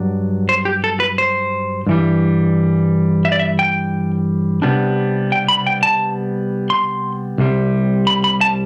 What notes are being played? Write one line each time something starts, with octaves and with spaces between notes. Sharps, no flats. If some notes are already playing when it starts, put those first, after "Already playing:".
Already playing: G2 F#3 D4
C5
G4
A4
B4
C5
G2 E3 G3
E5
D5
E5
G5
C3 G3 B3 D4
G5
B5
G5
A5
C6
C2 C3 G3
B5
B5
A5